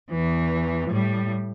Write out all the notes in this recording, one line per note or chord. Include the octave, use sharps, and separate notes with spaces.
E2 E3
A2 G3